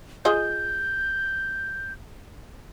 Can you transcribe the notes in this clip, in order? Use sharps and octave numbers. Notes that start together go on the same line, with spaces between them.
F4 G#4 D#5 G6